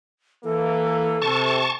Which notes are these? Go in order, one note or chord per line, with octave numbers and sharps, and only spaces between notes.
E3 A#3 A4
C3 A5 C#6